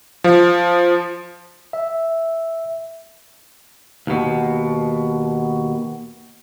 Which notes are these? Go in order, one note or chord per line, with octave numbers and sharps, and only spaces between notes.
F3
E5
D#2 B2